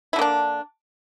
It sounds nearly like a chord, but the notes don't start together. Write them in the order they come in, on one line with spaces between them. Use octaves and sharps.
E4 D3 A#3 D4